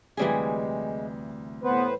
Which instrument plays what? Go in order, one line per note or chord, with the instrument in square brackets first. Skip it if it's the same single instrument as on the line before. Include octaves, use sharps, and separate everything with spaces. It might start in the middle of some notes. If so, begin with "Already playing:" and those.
[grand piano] D2 C3 [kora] E3 G3 G#4 [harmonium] G#3
[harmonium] A2 B4 C5 [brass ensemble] B3